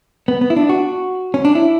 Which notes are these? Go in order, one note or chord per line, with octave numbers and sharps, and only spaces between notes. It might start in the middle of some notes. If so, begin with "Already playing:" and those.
B3
B3
E4
D4
F#4
C#4
D4
E4